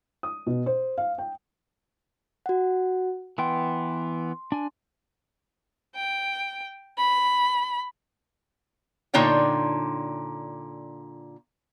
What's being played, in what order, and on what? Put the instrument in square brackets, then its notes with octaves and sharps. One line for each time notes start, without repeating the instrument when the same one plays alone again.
[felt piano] D#6
B2
C5
F5
G5
[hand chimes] F#4 F#5
[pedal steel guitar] E3 B3 G5 [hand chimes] C6
[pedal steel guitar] D4 G#5
[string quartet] G5
B5
[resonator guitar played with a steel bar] A#2 D3 D#4 F4 C#5 G5